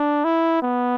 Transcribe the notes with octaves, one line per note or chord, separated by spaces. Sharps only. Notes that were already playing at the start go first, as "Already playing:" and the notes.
Already playing: D4
E4
B3